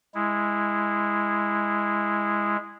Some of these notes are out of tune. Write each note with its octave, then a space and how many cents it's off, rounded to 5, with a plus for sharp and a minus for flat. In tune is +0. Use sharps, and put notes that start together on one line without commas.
G#3 -5 E4 +0